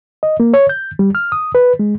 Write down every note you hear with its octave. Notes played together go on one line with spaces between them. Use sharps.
D#5
A#3
C#5
G6
G3
F6
D#6
B4
G#3